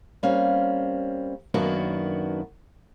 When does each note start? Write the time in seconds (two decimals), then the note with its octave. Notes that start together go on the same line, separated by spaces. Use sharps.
0.23 G3 A#3 C4 C#4 F5
1.54 F#2 D#3 A#3 B3 D4 F#4